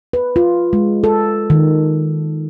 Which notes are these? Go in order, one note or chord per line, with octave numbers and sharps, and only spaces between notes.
B4
F4
G#3
A4
D#3